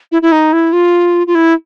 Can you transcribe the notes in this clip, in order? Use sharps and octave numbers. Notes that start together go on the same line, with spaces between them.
E4
E4
D#4
E4
F4
F4
E4